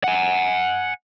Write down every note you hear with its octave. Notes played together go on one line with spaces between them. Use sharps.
F#5 G#5